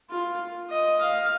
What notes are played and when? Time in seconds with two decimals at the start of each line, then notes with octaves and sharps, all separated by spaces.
0.10 F4
0.70 D#5
1.01 F5